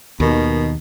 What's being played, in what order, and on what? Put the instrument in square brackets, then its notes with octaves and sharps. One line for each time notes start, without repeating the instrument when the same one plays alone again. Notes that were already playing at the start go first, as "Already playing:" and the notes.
[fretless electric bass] D#2 [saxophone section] B2 D#3